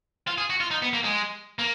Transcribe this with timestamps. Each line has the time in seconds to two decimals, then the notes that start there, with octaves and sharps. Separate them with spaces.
0.28 F4
0.38 G#4
0.50 F#4
0.61 F4
0.71 D#4
0.82 B3
0.93 A#3
1.04 G#3
1.59 A#3